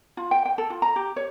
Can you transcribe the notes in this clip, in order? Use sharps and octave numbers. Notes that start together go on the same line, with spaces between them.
F4
G5
G5
A4
F4
A#5
G4
C#5